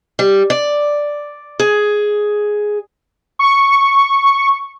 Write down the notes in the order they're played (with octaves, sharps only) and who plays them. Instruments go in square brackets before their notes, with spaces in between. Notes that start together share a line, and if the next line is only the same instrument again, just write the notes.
[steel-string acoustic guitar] G3
D5
G#4
[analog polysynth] C#6